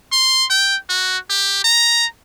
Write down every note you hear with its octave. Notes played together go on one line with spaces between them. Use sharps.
C6
G5
F#4
G4
A#5